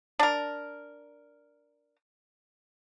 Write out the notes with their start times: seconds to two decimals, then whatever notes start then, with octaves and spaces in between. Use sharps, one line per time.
0.19 D4 A#4